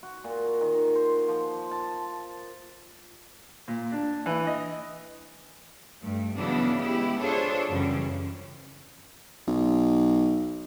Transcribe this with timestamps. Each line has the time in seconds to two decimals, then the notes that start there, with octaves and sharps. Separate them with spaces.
0.03 F#4
0.24 A#2
0.61 D#3
0.95 C5
1.28 F3
1.71 A5
3.68 A#2
3.92 D4
4.26 E3
4.47 D#5
6.02 G2 A3
6.37 C#3 E3 F#3 B3 D4 E4
6.78 G#3 B3 E4 G4
7.22 D4 F4 G#4 A4 C5 C#5
7.69 F#2 C#3 E3 G3 C#4
9.47 B1